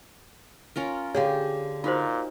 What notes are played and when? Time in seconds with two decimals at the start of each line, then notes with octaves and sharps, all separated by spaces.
0.76 C#4 F4 A#4
1.15 D3 G4 G#4 C#5 F5
1.84 A#2 D#4 F4 F#4 C5